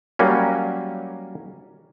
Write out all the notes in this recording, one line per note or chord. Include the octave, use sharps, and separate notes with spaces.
F#3 G3 A#3 C#4